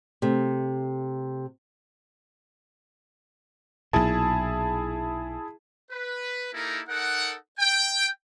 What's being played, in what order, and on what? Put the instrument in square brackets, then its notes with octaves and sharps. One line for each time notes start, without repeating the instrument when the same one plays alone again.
[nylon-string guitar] C3 A3
[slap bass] B1 A#2 [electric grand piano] E4 G#4 A5
[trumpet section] B4
A#3 D#4 E4 G4 A4 A#4
D#4 A4 A#4 F#5
G5